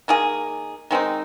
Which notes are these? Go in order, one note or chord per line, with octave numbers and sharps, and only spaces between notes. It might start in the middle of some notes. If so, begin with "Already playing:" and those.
D#3 A#3 G#4
D#3 G#3 C4 D#4